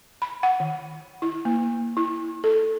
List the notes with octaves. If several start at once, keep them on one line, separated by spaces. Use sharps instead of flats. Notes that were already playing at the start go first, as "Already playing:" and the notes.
B5
F#5
D#3
E4
A#3
E4
A4